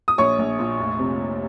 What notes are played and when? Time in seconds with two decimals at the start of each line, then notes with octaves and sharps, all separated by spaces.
0.08 D#6
0.18 A#1 C#5 C#6
0.39 A#1
0.59 A#2
0.79 F1
0.99 C3